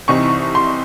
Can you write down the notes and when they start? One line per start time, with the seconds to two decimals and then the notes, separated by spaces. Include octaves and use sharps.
0.08 C2 C3 E3 C4 D#4 C#6
0.55 C6